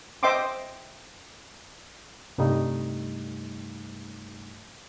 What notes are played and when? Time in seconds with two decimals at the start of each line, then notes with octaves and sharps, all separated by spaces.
0.23 C5 D#5 E5 G5 C6 D6
2.38 C2 G2 G3 A3 D#4